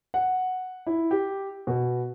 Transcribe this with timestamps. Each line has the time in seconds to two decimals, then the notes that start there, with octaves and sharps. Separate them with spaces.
0.14 F#5
0.87 E4
1.11 G4
1.67 B2